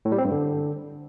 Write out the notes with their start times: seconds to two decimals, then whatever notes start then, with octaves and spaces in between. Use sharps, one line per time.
0.05 A2
0.12 G3
0.18 C4
0.25 G2
0.31 D3